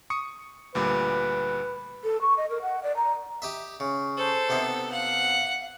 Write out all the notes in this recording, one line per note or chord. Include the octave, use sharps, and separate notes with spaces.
C#6 D#6 C#7
D2 A#2 G3 B4
A4
C#6
D#5
A#4
F#5
D5
A#5
G4 D#5 E5
C#3
A4 C5
C3 B3 D#4
F5 F#5